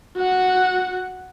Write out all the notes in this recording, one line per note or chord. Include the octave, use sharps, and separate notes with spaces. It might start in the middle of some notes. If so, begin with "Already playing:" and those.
F#4 F#5